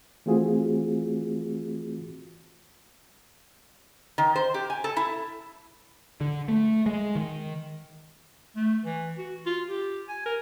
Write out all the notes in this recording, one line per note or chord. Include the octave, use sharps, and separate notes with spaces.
E3 A3 C4 F4 F#4 G#4
D#3
C5
G4
G#5
A4
E4
D3
A3
G#3
D#3
A3
E3
F#4
F4
G4
G#5
A#4